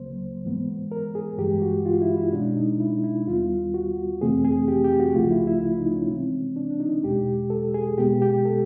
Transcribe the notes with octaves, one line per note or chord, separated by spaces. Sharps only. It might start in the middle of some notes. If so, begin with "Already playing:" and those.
Already playing: C#2 C#3 F#3 A#3 C5
G#2 E3 G#3 B3
A#4
G#4
G2 E3 G#3 G4
F#4
F4
E4
E4
B2 G#3 C#4 D4
D#4
E4
E4
D#2 D#3 G3 B3 F4
F#4
F2 C3 E3 A3 C4 G#4
G#4
G4
G4
F#4
C#2 C#3 F3 A3 F4
E4
E4
D#4
C#4
C3 E3 G#3 C4
D4
D4
D#4
E2 B2 G#3 G4
A4
G#4
B2 G#3 B3 G4
G4
A4